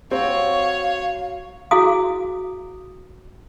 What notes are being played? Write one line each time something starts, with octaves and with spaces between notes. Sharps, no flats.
F#3 C4 C#5 F5
E4 F#4 G#4 F5 D#6